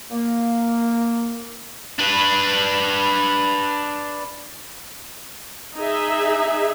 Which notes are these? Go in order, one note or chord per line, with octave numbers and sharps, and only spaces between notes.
A#3
D4 B4
D#4 G#4 E5